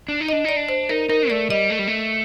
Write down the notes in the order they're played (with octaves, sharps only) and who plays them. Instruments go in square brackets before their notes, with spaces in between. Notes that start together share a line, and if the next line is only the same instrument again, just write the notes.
[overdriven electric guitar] D4
D#4
[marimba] D#5
[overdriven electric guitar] D4
[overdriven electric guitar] D#4 [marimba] D5
[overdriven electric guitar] D4
[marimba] C5
[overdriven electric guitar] D#4 [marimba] A#4
[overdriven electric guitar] D#4 [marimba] A#4
[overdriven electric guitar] A3 [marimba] D5
[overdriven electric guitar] G3 [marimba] D#5
[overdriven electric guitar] A3
G3
A3